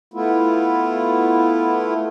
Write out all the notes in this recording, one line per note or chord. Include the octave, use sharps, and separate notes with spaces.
A3 B3 E4 F4